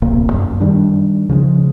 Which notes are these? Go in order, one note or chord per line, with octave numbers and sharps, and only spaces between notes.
D1 A#1 C3 A#3
F#2
D#3 G3 D4
C#3 F3 G3 G#3